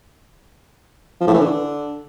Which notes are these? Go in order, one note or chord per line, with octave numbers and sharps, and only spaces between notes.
F3
A2
E3
D3